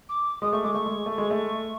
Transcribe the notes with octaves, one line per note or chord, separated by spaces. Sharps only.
D6
G#3 D#6
A3 C#6
G#3 D6
A3 C#6
G#3
A3
G#3
A3